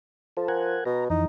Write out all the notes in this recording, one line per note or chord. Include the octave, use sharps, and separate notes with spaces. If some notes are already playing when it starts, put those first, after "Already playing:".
F3 A4
A#4 F#5 G#5
B2 A#5
F2 E3 D#4